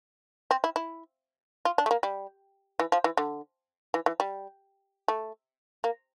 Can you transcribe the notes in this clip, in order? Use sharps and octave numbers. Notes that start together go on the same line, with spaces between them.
C4
E4
E4
F4
D4
A3
A#3
G3
E3
F3
E3
D3
E3
E3
G3
A3
A#3